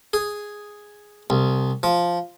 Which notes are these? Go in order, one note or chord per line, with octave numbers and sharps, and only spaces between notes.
G#4
C2
F3